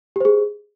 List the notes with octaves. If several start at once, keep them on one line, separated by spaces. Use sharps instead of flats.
G4 G#4 C5